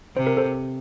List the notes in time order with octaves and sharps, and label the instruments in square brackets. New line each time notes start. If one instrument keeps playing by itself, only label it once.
[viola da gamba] C3 [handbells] C5
[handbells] A#4
A4 C5